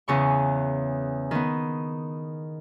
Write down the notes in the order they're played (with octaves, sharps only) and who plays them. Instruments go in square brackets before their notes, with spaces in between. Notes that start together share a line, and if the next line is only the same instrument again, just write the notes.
[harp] E2 C#3 C#6
D#3 B3